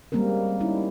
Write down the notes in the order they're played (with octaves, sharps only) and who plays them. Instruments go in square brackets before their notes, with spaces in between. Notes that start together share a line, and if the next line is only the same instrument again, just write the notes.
[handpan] G3 G#3 A#3 C4 C#4 A#4
C#4 D#4 E4